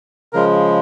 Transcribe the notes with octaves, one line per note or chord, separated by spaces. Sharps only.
C#3 F3 G#3 A#4